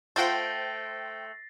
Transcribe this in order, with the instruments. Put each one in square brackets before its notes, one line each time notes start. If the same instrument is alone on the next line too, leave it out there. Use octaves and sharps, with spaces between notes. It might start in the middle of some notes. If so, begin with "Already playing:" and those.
[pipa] A3 F4 F#5 [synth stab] C5 G5 [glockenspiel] A6 A#6 C7